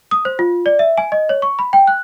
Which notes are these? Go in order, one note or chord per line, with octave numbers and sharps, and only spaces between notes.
D#6
C5
F4
D5
E5
G#5
D#5
C#5
C#6
B5
G5
F#6